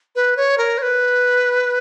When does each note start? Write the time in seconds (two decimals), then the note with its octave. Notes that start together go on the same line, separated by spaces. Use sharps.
0.16 B4
0.37 C#5
0.58 A#4
0.78 C#5
0.82 B4